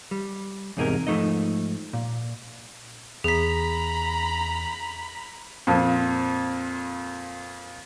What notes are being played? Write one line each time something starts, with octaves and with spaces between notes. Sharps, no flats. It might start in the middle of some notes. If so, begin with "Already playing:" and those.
G3
E2 G#2 C3 D#4 G#4 A#4
G#2 F3 A3 D#4 D#5
A#2
E2 G#4 A#5 B5 B6
F2 A#2